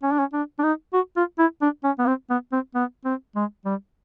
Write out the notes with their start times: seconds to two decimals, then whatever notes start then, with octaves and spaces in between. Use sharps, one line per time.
0.03 C#4
0.12 D4
0.19 C#4
0.33 D4
0.59 D4
0.63 D#4
0.93 F#4
1.17 F4
1.39 E4
1.61 D4
1.84 C#4
1.99 B3
2.06 C4
2.30 B3
2.52 C4
2.75 B3
3.05 C4
3.35 G#3
3.65 G3